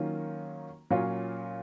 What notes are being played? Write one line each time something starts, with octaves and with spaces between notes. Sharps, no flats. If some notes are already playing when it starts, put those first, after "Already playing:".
Already playing: D#3 F#3 A#3 C#4 F4
A#2 F#3 C#4 F4